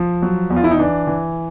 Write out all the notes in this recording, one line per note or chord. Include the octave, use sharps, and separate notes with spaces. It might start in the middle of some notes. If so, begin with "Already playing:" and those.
Already playing: F3
F#3
E2
F4
E4
D#4
E3 D4
E3